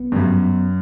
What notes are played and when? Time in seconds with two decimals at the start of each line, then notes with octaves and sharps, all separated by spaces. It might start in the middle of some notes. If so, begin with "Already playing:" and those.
Already playing: B3
0.12 G2
0.16 F#2